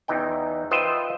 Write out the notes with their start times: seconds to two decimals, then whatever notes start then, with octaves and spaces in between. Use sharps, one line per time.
0.08 E2 E3 D#4 G5
0.71 F4 B4 C5 D#5 E5 G5